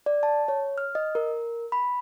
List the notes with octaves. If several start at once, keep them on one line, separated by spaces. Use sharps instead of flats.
D5
A5
C#5
F6
D#5
A#4
B5